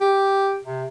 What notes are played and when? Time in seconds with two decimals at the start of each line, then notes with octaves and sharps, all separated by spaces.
0.01 G4
0.65 C3